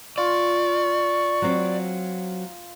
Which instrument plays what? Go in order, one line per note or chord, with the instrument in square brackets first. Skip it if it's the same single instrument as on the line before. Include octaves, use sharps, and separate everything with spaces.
[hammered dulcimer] F4 [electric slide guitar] D5 [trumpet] C#6
[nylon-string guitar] F#3 C4